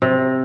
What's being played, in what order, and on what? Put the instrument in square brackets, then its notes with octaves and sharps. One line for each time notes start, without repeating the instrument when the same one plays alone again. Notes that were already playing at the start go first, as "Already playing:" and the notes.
[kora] C3